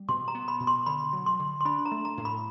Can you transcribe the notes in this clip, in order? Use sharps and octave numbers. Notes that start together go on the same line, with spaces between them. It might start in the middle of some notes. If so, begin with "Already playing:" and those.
Already playing: G3
B2 C6
A#5
B3
B5
B2
C6
D3 B5
F#3
C6
D3
C6
D4 B5
A#5
A3
A#5
A2
B5